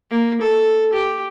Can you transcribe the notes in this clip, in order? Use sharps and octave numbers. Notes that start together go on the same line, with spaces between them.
A#3
A4
G4